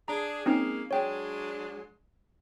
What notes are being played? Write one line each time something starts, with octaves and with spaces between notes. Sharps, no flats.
D4 G#4 A#5
G#3 A#3 C4 C#4 D#4
F#3 G#3 D4 C#5 G5